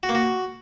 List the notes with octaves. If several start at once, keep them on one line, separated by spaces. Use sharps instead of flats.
F#4
A#3
F#4